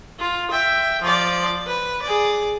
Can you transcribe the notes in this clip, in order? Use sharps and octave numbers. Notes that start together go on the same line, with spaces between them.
F4
E5 G5
F3 D5
B4
G#4 D5